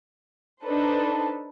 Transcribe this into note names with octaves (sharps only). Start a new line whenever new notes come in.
D4 D#4 A4 B4 C5